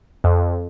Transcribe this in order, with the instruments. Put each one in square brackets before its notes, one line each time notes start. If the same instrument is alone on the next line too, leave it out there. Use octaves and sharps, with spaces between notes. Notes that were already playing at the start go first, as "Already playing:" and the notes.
[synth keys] F2